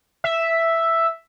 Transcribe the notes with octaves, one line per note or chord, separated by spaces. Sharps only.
E5